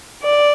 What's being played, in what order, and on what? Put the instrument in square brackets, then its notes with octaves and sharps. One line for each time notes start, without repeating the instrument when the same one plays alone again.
[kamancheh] D5